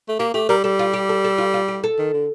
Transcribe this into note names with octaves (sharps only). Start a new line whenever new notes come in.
A3
A#3 G4
A3 G4
G3 A#4
G3 A4
F4
G4
A4
A4
F4
F4
G4
A4
D#3
D3